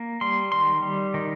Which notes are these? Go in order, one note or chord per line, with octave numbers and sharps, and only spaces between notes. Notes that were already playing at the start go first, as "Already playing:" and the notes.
Already playing: A#3
G3 C6
D#3 C6
G3
D#3